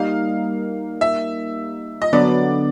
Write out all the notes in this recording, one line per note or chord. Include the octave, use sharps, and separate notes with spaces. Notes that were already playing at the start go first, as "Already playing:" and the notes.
Already playing: G3 A#3 D#4 F5
E5
D#5
D3 F#3 B3 D4 D5